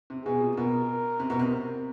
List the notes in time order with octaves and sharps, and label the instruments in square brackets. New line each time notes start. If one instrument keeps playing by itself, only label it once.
[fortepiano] C3
[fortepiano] B2 [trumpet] G#4
[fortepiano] A#2
[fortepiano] B2 [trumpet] A#4
[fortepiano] C3
B2
C3